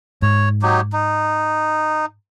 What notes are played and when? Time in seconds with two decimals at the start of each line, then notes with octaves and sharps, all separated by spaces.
0.22 G#2 C#5
0.62 F#3 D#4 G4
0.93 D#4